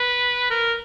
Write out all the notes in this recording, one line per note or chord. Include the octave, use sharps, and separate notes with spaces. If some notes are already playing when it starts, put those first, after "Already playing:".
Already playing: B4
A#4